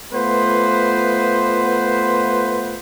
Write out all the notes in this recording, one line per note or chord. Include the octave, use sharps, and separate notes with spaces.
A3 B3 F4 B4 C5